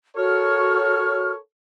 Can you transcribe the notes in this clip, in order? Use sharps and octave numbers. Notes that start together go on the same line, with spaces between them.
F#4 A4 A#4 C#5 F6